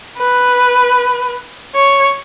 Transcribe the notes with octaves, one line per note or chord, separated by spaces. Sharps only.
B4
C#5